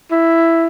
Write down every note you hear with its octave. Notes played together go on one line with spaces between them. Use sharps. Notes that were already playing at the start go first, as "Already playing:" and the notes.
E4